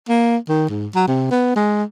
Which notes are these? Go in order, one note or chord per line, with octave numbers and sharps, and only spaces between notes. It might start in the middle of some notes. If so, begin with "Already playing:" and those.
A#3
D#3
G#2
F#3
C3
B3
G#3